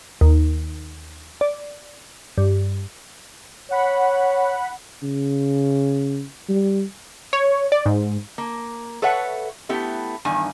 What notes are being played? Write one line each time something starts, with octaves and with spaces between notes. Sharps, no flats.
D#2
D5
G2
C#5 F#5 B5
C#3
G3
C#5
D5
G#2
A#3
A4 B4 C#5 E5 F#5
A3 B3 E4 G4
E2 G2 D#3 G#5